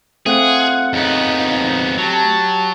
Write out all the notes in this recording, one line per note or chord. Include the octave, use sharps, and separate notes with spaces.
A3 C4 F4 G#4 F#5
F2 C#3 B3 D#4
F#3 G4 A5